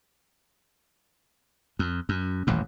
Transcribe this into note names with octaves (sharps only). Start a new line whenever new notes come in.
F2
F#2
D#1 A1 F#2